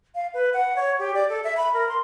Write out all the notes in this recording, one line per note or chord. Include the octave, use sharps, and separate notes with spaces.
F5
B4
F#5
C#5
G4
D5
A4
E5
B5
A#4
C6